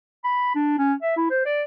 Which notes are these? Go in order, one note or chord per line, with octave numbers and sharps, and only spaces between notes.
B5
D4
C#4
E5
E4
C5
D5